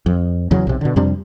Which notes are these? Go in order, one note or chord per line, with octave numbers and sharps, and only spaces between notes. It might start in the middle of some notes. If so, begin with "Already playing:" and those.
F2
E2 C#3 F#3
B1 C3
B2 D3
F2 C3 G3 D4